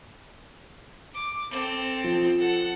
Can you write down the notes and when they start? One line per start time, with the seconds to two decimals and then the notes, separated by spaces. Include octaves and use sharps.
1.14 D6
1.51 C4 A4
2.04 F3
2.38 A4 F#5